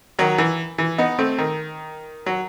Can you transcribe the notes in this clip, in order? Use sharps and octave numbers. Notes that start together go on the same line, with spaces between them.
D#3 F#3
E3
E3
B3 D#4
A3 C4
D#3
F#3